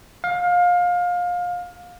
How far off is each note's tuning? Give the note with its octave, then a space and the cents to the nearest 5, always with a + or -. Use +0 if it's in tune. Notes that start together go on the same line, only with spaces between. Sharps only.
F5 +25